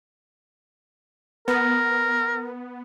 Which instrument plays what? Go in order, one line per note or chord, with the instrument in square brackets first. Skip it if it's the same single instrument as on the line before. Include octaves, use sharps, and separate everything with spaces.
[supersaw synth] B3 [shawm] A#4